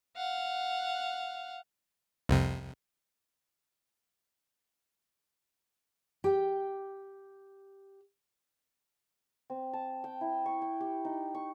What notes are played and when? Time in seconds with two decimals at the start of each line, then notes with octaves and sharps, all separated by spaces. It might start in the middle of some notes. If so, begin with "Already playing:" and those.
0.16 F5 F#5
2.29 C2 F2 C3
6.24 G4 G5
9.50 C4
9.73 A5
10.04 G5
10.21 E4
10.46 C#6
10.62 G5
10.80 G4
11.05 D#4
11.35 C#6